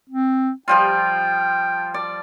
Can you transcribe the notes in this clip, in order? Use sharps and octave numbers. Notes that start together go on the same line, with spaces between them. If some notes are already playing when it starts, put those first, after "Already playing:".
C4
F3 G3 F4 G5
D5